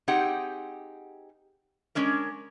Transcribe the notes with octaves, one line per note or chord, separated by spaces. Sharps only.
C4 D#4 G4 G#4 F#5
G#3 C#4 D4 A#4